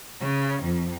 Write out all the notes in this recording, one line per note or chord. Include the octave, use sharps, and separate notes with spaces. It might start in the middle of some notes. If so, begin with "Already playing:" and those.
C#3
F2